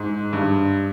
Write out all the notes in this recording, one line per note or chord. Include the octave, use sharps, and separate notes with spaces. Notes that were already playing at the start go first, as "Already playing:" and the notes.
Already playing: G#2
G2